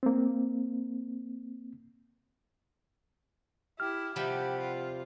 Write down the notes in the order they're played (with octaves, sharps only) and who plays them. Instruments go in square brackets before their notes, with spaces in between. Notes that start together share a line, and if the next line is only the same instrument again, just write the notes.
[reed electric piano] A#3 C4
[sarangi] E4 [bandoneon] G4 [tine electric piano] F6
[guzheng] C3 F3 G3 [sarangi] G4 [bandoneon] F#5 B5
[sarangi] F4